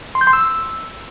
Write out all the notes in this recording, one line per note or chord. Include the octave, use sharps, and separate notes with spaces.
C6
G6
C6
E6